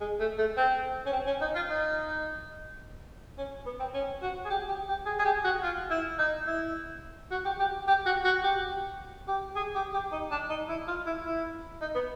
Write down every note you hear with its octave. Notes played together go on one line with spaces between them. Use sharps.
G#3
A3
A3
C4
C#4
C4
C#4
D#4
F4
D#4
C#4
B3
C4
C#4
F#4
G#4
G4
G4
G4
G#4
G#4
G4
F#4
F4
E4
D#4
E4
F#4
G4
G4
G4
F#4
F#4
G4
G4
G#4
G4
G4
D#4
D4
D#4
E4
F4
E4
E4
D#4
B3